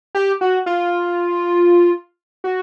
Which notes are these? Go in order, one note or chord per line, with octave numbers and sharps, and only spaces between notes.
G4
F#4
F4
F#4